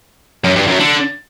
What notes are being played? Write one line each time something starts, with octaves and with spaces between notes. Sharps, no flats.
F#2
G2
F#2
D3